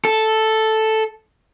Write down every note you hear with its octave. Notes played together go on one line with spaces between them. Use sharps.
A4